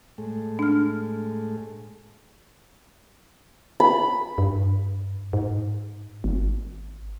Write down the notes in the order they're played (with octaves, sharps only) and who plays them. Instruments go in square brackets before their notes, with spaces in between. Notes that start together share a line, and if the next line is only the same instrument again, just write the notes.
[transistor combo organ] A2 G#3 A3
[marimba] D4 F6
[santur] B5
[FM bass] G2
G#2
G#1